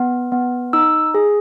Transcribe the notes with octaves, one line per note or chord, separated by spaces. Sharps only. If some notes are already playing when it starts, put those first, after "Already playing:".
Already playing: B3
B3
D#4 E6
G#4